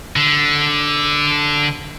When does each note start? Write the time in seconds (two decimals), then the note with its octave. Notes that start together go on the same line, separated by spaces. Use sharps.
0.16 D3